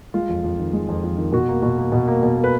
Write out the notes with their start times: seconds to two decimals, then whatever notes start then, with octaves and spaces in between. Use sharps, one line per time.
0.14 G#3 F4
0.29 F2
0.44 F2
0.59 D#3
0.73 G#3
0.89 F2
1.04 F2
1.18 D#3
1.32 B2 F#4
1.48 A#3
1.62 B2 F#4
1.78 A#3
1.92 B2
2.08 A#3
2.23 B2
2.37 A#3
2.44 B4